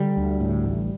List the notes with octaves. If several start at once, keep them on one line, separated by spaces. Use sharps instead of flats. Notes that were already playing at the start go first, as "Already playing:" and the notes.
Already playing: D3 G3
D2
A2
A1